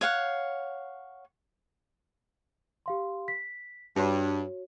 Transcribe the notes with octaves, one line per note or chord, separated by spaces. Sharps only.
C#5 F5 F#5
G4 F5 C6
B6
G2 F#4 C#5